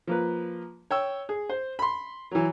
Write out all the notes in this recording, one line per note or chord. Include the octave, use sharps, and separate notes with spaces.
F3 A#3 B4
C#5 G5 E6
G#4
C5
B5 C6
E3 F#3